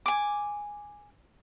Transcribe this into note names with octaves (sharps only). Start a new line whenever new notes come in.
G#5 D6